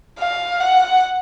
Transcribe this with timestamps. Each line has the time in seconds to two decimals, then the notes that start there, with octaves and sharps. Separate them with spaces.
0.19 F5
0.60 F#5